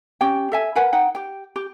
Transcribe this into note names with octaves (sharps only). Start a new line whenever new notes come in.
C#4 G4 G5
A4 E5 G#5
A#4 B4 F#5 G#5
D#4 F#5 G5
G4 G5
G4